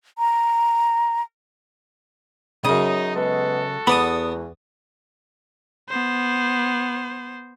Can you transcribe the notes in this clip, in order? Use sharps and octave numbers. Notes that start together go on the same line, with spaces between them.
A#5
F#2 C#3 D#4 D#6
G#3 B3 F#4 A4
E2 B3 D5 B5 D#6
B3 C5